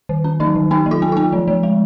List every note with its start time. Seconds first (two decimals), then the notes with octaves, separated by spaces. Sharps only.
0.09 D#3
0.24 C#4
0.40 F#3 D#4
0.55 D#3
0.71 B3 D#4
0.86 F#3
0.91 F4
1.02 B3
1.12 B3 F4
1.32 F3
1.48 F3
1.63 G#3